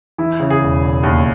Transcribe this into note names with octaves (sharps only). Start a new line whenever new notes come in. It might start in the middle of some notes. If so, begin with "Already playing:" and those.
E3 E4
C#3
G#4
E1
E1
D#2